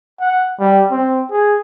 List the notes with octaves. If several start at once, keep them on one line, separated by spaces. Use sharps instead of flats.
F#5
G3
C4
G#4